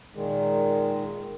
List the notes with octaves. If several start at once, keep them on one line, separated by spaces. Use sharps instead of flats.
A#2 D#3 G#3